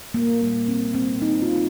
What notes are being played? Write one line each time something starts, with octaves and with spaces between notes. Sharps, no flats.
A#3
A#2 G3 A#3
C4
C4
D#4
F4